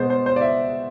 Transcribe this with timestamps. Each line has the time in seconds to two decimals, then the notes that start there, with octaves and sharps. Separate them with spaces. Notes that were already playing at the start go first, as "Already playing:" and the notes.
Already playing: B2 G#3 B3 C5
0.10 C5
0.26 C5
0.36 D5
0.41 E5